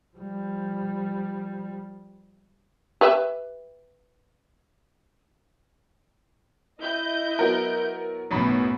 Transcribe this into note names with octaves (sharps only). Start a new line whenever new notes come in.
F3 G3
G4 B4 E5
E4 D#5 G6
F#3 B3 A#4
B1 F#2 A2 B3 B5